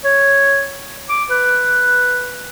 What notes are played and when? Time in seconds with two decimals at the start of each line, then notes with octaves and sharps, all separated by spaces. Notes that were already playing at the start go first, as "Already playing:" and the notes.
0.04 C#5
1.09 D6
1.30 B4